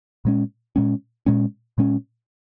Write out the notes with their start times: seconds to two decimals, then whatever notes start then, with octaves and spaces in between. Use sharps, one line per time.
0.25 A#2 G#3 C#4
0.76 A#2 G#3 C#4
1.26 A#2 G#3 C#4
1.78 A#2 G#3 C#4